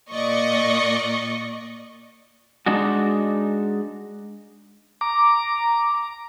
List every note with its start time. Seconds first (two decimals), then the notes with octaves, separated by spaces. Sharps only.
0.11 A#2 D5 D#5 C#6
2.66 G#3 D4 D#4 F#4
5.01 A#5 D6